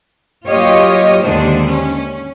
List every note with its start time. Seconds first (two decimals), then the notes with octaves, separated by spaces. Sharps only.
0.49 F#3 A#3 F4 G4 C#5 D#5
1.24 D#2 D3 D#3 G#3 D4 C5
1.70 C#4